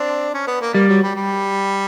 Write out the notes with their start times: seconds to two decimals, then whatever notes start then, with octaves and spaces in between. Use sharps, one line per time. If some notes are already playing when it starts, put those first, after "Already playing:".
Already playing: C4 D4
0.34 C#4
0.47 B3
0.61 A#3
0.74 G3 A#3
0.88 F#3
1.03 G3
1.15 G3